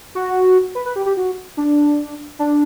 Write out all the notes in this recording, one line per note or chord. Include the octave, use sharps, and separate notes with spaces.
F#4
B4
B4
G4
G4
F#4
D4
D4